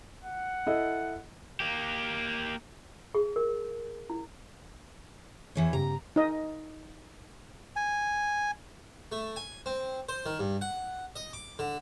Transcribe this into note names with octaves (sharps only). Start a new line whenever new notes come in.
F#5
E4 A4 D#5
A#3 G4
G#4
A#4
E4
E2 E3 C#5
G2 C#3 G4 A#5
D#4 D#5
G#5
A3
G#5
C4
C5
D#3
G2
F#5
D#5
D6
D3